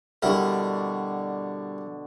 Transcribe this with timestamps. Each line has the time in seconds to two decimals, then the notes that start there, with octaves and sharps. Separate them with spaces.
0.22 B2 D3 G3 E4 F#4 A#4